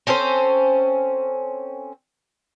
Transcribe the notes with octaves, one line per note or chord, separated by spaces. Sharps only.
C4 C#4 A4 C5